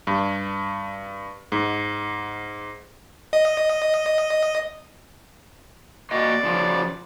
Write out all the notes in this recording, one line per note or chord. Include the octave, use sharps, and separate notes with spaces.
G2
G#2
D#5
A#2 F#4 D5 D#5
C#3 F3 F#3